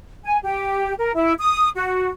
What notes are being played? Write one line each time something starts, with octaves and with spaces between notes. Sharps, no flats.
G#5
G4
A#4
E4
D#6
F#4